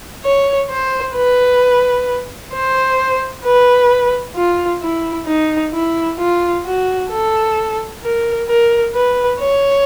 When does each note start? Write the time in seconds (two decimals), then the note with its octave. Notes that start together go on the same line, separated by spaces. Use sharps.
0.23 C#5
0.69 C5
1.15 B4
2.53 C5
3.45 B4
4.36 F4
4.81 E4
5.27 D#4
5.73 E4
6.19 F4
6.65 F#4
7.11 A4
8.03 A#4
8.48 A#4
8.94 B4
9.40 C#5